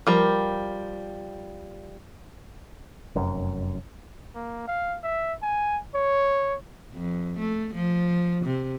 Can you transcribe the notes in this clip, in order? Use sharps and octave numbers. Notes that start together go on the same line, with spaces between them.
F3 G3 A#4
F1 F#2
A#3
F5
E5
G#5
C#5
F2
A3
F3
C3